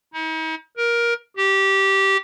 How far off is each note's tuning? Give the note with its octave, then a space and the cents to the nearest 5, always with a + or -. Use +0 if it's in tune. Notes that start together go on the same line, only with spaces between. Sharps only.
D#4 +45
A#4 +15
G4 -15